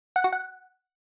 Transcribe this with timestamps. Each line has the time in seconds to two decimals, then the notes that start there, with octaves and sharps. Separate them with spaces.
0.16 F#5
0.24 F#4
0.33 F#5